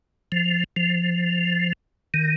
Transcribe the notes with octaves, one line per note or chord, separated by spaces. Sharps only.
F3
F3
D#3